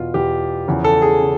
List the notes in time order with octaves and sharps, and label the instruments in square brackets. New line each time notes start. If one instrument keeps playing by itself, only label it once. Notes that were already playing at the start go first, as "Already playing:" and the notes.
Already playing: [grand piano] E2 B2 F4
E2 B2 G4
E2 C#3 F3
A4
G#4
C#3